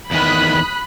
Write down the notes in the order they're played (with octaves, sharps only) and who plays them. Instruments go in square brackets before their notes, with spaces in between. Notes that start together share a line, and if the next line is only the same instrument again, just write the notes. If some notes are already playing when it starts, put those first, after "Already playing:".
[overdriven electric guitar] E2 D#3 [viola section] B5 [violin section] D#6 F#6 B6